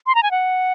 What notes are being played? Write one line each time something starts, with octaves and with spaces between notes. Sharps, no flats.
C6
A#5
G#5
F#5